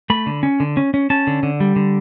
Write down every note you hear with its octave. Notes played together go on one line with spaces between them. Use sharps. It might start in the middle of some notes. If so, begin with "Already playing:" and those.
A3 B5
D3
C#4
D3
C#4
C#4
C#4 A5
D3
D3
G3
D3